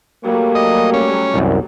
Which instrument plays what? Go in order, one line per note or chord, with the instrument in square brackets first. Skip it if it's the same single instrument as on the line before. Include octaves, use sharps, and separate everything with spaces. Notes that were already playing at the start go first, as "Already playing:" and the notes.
[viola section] F#3 G3 A3 [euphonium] A#3
[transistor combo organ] D#5
C#4
[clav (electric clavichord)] C2 F#2